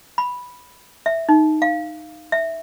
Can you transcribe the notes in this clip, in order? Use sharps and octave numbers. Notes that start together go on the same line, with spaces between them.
B5
E5
D#4
F5
E5